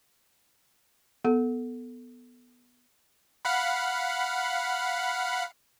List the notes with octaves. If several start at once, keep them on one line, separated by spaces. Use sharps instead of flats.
B3 A4
F5 F#5 B5